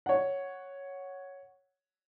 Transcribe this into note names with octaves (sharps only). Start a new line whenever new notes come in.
C#5 F#5